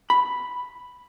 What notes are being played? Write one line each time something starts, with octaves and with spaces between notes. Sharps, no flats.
B5